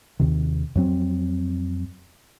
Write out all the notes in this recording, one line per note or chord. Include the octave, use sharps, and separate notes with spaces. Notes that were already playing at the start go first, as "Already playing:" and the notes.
D#2 C3 D#3
F2 F#3 C4